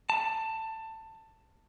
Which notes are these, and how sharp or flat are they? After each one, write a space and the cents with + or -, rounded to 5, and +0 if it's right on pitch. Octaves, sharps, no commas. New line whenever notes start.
A5 +15